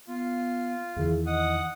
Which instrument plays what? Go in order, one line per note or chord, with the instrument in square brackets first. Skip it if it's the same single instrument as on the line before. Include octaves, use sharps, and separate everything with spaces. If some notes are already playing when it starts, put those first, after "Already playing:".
[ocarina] B3 [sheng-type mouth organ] F4
[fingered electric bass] E2 D#3 E3 [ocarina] G#4
[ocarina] D#5 [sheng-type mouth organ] F#5 D#6